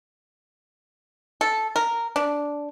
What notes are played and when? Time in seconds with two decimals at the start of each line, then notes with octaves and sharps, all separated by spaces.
1.41 A4
1.76 A#4
2.16 D4